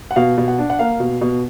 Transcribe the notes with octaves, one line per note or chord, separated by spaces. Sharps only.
F#5
B2 F5
B2
F#5
D4
F#5
A#3 F5
B2
B2